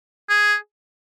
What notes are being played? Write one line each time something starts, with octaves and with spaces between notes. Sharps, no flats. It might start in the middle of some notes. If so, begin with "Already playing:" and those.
G#4